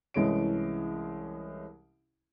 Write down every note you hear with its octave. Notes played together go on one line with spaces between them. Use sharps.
C2 E3 G#3 C#4 D7